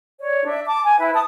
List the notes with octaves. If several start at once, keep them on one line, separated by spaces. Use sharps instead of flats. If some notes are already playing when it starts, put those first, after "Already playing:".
C#5 D5
D4 E5
A5 D6
G#5
E4 B4 E5
A5 D#6